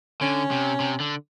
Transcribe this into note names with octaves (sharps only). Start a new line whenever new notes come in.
D3 C#4
C3
C3
D3